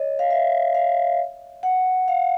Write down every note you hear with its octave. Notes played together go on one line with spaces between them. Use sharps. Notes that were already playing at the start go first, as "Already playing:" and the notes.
Already playing: C#5 D#5
F5
E5
F5
F#5
F5